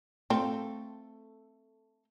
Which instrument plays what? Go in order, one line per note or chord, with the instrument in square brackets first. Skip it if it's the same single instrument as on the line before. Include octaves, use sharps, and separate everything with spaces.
[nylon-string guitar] A3 A4 [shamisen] C4 F4